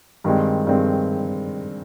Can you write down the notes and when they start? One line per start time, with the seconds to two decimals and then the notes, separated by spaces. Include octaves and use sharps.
0.24 G2 D#3 G#3 C4
0.67 G2 D#3 G#3 C4